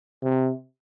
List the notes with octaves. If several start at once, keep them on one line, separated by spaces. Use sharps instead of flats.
C3